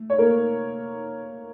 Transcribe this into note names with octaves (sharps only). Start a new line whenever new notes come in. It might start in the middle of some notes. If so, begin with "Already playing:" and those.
Already playing: A3
C#5
A#3 A#4